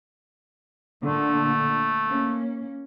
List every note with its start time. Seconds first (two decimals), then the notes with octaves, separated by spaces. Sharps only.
1.03 A#2 D3 A3
2.05 A#3 C#4